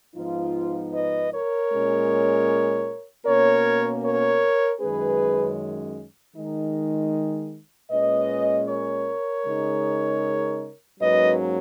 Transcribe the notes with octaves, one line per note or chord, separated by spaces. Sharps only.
G#2 F3 B3 D#4 F4
B4 D#5
A#4 C#5
A#2 G#3 C#4
B2 A#3 C#4 A#4 C#5
A#4 C#5
F#2 D#3 G#3 C#4 G#4 B4
D#3 G#3 D#4
A#2 G#3 C#4 B4 D#5
A#4 C#5
C#3 G#3 D#4
G#2 F#3 A#3 C#4 B4 D#5